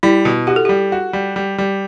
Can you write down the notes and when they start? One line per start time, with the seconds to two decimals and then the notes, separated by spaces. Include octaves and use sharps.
0.03 G3 E4
0.25 B2
0.47 F#4 G4
0.56 A4
0.65 G3 G4
0.92 F#4
1.13 G3
1.36 G3
1.58 G3